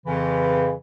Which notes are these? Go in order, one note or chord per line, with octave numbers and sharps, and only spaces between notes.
F2 C#3 E3